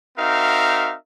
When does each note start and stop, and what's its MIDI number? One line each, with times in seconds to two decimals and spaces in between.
0.18 0.94 60
0.18 0.94 63
0.18 0.94 66
0.18 0.94 70
0.18 0.94 76
0.18 0.94 77